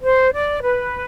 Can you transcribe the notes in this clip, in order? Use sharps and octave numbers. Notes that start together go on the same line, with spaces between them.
C5
D5
B4